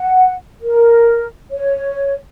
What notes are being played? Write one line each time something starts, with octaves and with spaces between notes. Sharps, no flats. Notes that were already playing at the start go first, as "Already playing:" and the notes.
Already playing: F#5
A#4
C#5